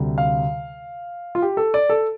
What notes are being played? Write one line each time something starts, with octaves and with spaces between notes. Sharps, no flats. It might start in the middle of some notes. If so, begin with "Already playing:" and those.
Already playing: D2 C3 G3
F5
F4
G4
A4
D5
A4